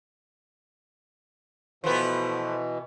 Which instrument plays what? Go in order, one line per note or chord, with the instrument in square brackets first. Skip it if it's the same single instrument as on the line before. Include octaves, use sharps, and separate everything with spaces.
[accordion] B2 E3 [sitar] F3 A3 B3